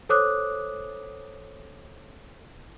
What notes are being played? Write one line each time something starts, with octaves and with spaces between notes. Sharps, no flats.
A4 C5 C#5 D6 D#6 F#6